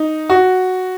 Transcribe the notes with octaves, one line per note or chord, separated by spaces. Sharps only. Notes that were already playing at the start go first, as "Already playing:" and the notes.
Already playing: D#4
F#4